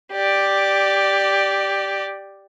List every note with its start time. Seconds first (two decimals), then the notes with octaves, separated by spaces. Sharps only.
0.12 G4 D5